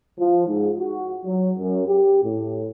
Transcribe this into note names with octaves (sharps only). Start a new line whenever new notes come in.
F3
G#2
F#4
F#3
F#2
G4
A2